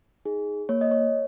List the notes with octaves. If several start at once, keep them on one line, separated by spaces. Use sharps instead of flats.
D#4 G#4
A#3 C#5
D#5
C#5